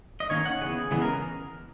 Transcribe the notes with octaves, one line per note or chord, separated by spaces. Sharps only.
D#5
D#3 A#3 C#4 C#5
F#5
C#3 E3 B3 G#4
C#3 E3 G#3 B3 G#4
A#4